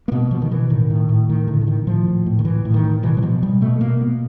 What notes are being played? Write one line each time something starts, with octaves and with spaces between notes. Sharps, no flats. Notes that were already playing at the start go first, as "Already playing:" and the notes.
A#3
B2 B3
B2 F3
D#3
B2 E3
A2 D#3
A2
A2
A2 D#3
A2 D3
D3
A2 D#3
A2 F3
A2
A2
D#3
A2 E3
A2
D#3
A2
B2 E3
F#3
B2 F3
B2 G3
B2 A3
B2 A#3
B2 B3